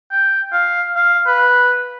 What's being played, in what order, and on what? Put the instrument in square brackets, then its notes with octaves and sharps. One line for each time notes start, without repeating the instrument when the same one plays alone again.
[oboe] G5
F5
F5
B4